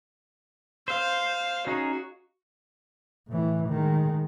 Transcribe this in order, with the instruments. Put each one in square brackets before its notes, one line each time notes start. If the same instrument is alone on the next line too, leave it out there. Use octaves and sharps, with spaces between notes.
[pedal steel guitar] C5 [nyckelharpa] F5
[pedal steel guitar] C#4 D#4 G#4 [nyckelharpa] F#4
[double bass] A2 E3
D#3 G#3